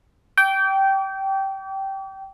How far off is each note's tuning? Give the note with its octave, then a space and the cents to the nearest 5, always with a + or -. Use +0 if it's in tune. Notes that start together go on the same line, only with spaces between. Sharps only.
G5 -15 D6 -40